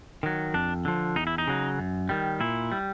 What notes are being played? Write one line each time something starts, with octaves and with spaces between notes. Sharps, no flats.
D#3 F#3
F2 D4
D3 F3
E2 D#4
E4
D#4
C#3 F#3
F#2
D#3 G3
A#2 E4
G3